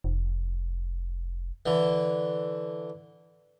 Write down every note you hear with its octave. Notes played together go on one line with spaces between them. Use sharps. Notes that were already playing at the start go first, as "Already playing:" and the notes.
F1
D3 E3